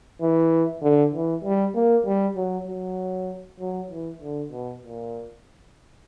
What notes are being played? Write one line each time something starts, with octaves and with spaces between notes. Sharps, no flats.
E3
D3
E3
G3
A#3
G3
F#3
F#3
F#3
E3
D3
B2
A#2